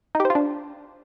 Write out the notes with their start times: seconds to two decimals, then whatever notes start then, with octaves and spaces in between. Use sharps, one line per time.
0.15 D#4
0.20 G4
0.25 C5
0.30 F4
0.35 D4